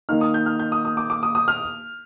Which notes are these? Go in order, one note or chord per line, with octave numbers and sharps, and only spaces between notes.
D#3 A#3 D#4 F6
D#6
G6
F6
G6
D#6
D#6
D6
D6
D#6
D#6
F6